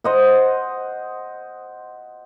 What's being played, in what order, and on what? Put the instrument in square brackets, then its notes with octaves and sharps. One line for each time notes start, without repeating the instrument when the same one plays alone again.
[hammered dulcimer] C5 D#5 F#5